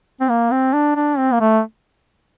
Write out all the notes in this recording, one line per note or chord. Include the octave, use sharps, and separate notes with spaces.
C4
A#3
C4
D4
D4
C4
A#3
A3